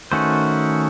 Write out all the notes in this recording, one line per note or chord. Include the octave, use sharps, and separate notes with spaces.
D#3 A3 C#4 F#4 C5